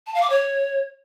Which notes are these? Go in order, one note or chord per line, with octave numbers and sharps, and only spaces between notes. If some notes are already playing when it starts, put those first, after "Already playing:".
A5
F5
D6
C#5